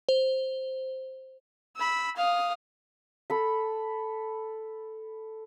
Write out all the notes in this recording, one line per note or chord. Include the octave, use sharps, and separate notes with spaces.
C5
B5 E6
F5 D#6
A4 B5